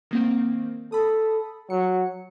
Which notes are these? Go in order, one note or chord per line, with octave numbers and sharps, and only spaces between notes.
D#3 A#3 C4
A4 B5 D#6
F#3 C#7